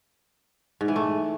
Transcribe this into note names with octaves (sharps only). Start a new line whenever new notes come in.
G#2
E3
A3